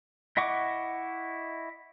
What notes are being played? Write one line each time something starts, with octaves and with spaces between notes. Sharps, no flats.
E4 D#5 F#5 C#6 D6